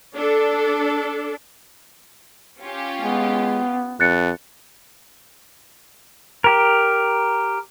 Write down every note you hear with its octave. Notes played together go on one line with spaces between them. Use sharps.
D4 A4
C#4 F4 G4
G#3 B3
F2 F#6 A6 C#7
G4 A#4